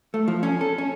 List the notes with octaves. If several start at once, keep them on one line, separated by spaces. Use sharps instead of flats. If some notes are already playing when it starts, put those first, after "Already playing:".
A3
F3
C#4
A4
C#4